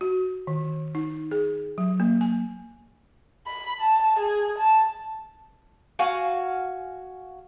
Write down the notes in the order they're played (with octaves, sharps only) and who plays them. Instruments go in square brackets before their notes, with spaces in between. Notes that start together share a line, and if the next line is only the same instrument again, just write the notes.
[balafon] F#4
D#3
D#4
G#4
F#3
A#3
G#5
[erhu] B5
A5
G#4
A5
[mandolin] F#4 F5 G#5